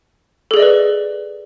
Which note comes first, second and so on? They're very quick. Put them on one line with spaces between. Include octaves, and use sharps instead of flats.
A4 G#4 D5 D#5 B4